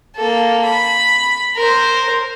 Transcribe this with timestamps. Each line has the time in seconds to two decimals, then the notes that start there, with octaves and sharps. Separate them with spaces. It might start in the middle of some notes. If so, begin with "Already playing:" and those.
0.16 A#3 A4
0.65 B5
1.57 A#4 C5